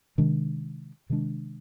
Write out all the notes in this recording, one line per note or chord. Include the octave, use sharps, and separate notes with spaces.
C3 D#3 G#3 D4
C3 D#3 G#3 D4